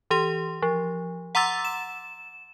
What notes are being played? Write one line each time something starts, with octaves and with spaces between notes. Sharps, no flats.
E3 G4 C6
F3
F#5 A#5 C6 D6 E6 A6
E7